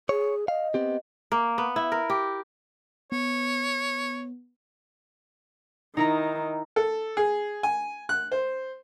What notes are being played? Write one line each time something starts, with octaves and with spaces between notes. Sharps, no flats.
G#4 C#5
D#5 F5
B3 C4 G4
A#3
B3
E4
A#4
G4
B3 C#5
D#3 D#4 E4 A#5
A4
G#4
G#5
F#6
C5